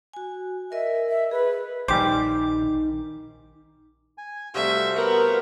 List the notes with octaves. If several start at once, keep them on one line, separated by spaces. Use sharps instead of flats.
F#4 G#5
A#4 D#5 E5
E5
G#4 B4
A#1 D#3 G3 D#4 G4 C5 G#5 D6
G#5
C3 G3 A3 F#4 C5 E5 F5
B3 A#4